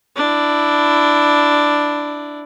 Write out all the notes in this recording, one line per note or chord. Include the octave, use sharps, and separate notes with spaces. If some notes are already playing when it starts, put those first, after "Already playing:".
D4 E4